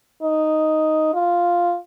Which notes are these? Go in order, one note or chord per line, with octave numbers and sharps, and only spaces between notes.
D#4
F4